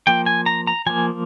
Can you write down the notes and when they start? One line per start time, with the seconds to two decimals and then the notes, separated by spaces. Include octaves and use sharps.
0.07 F3 A#3 G5
0.26 G#5
0.46 A#5
0.67 A#5
0.86 F3 A#3 G#5